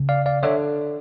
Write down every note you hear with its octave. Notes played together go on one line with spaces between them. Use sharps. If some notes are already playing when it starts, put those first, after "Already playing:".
Already playing: C#3
D5 F5
D5 F5
D3 C#5 E5